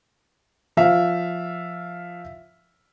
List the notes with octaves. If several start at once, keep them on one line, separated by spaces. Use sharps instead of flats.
F3 E5 F5